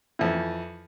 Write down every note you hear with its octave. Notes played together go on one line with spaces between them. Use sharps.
F2 E3